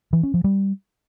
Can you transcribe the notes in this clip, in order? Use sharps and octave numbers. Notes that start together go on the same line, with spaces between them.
E3
C#4
F3
G3